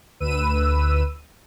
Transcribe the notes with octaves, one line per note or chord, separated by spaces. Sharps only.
D2 B4 E6 D#7